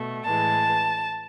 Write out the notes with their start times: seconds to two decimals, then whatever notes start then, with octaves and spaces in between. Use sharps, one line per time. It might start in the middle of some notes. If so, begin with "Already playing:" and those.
Already playing: B2 A3
0.26 A2 E3 G#3 A5